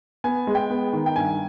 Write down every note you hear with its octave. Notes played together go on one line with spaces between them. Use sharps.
B3 G#5
G#3
G5
B3
D#3
G5
G2 G#5